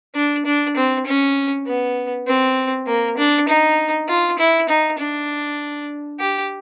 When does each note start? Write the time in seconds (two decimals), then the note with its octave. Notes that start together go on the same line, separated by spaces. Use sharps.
0.15 D4
0.46 D4
0.77 C4
1.07 C#4
1.67 B3
2.27 C4
2.87 A#3
3.18 D4
3.48 D#4
4.09 F4
4.39 E4
4.69 D#4
4.99 D4
6.20 G4